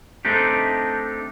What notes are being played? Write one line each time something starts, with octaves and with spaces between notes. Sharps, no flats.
A3 C4 D4 D#4 G4